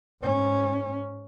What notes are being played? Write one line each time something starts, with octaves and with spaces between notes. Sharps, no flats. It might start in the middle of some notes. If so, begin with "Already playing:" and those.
G#2 C#4